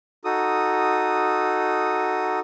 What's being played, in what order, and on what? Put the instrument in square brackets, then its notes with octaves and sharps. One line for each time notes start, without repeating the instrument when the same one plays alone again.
[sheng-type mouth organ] D#4 F#4 A4 D#6